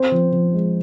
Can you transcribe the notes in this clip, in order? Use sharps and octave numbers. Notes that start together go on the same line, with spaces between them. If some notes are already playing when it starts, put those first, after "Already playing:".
Already playing: C4 C5
F3
F3
G#3